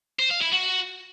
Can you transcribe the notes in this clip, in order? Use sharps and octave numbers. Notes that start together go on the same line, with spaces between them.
C5
F5
E4
F#4